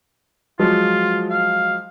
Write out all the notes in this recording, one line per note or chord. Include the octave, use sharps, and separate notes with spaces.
F3 F#3 G#3 F4
F5